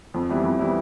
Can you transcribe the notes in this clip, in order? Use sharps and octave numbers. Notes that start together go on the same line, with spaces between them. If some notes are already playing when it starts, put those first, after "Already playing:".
F2
E3 G3 B3 E4
F2
E3 G3 B3 E4